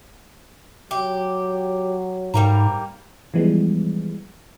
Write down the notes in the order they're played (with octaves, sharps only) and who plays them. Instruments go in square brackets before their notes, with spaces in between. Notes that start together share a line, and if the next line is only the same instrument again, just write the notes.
[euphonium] F#3 [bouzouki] G4
[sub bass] G#2 [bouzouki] G3 A#3 A#5
[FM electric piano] E3 F3 G3 G#3 B3